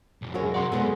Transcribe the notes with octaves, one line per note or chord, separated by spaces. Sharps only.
B1 F2
F#2 G#3 F#4 A#4 C#5
C3 D5 F#5 C6
F#2 B2 G#3 B3 F#4 A4